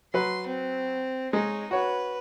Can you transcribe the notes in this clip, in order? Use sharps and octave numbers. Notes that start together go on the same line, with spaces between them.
F#3 B4 C6
C4
G#3 D#4 C#5
F#4 B4 C#5